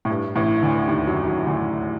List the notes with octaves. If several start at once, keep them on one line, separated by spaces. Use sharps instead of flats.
A2
G2
A1 A2
D2 D3
D#2 D#3
F#2 F#3
F#2 F#3
D2 D3